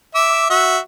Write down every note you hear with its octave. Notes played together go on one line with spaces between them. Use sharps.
E5 D6 E6
F#4 E5